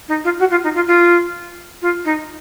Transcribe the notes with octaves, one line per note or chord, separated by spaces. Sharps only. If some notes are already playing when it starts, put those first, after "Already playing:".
D#4
F4
F#4
F4
D#4
F4
F4
F4
D#4